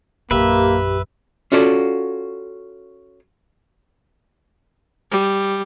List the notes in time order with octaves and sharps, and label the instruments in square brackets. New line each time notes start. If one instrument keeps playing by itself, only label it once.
[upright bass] A#1 F#2 [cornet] A#3 [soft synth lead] G4 [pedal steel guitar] B4 E5
[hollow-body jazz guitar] C#4 F4 F#4 A4 D5
[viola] G3